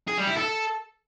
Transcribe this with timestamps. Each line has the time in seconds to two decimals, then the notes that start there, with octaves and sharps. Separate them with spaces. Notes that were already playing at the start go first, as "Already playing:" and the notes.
0.08 G#4
0.18 G3
0.27 E4
0.37 A4